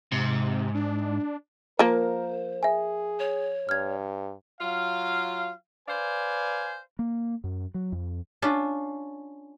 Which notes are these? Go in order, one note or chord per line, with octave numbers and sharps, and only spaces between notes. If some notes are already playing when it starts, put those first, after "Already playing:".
G#2 C3
D4
F3 A#3 A#4 C5
G#4 E5 G#5
C#5
G2 F6 G#6
F#3 F4 F5
B4 C5 D5 F5 G#5
A#3
F#2
F#3
F2
C#4 D4 F4